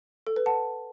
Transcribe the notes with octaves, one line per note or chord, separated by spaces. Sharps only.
A4
B4
F#5 A5